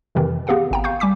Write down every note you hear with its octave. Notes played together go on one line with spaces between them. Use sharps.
F2 C3 D#3 E3
B3 G4 G#4 F5 F#5
G#1 G5 A#5
F5 C#6 G6
G3 G#5 D6 B6